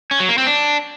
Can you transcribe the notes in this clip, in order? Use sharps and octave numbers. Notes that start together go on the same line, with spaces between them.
C#4
F#3
A#3
C4
D4